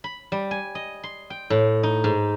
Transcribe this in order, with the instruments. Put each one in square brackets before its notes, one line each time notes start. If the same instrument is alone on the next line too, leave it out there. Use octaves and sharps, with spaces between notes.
[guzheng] B5
G3
G#5
D#5
C6
G5
A2
D#4
G#2